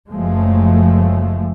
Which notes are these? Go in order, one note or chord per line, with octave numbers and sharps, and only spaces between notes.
F#1 F#2 F3 G#3 A3